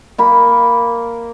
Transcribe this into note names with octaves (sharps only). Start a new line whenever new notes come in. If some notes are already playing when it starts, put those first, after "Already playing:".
A#3 B5